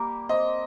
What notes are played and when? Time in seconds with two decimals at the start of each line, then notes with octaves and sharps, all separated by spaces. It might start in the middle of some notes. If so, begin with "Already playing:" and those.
Already playing: G3 A#3 G4 A#4
0.29 C4 D#5